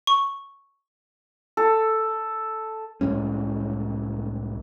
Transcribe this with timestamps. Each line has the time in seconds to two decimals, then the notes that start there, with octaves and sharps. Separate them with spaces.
0.07 C#6
1.57 A4
3.01 C2 A2 G#3 C#4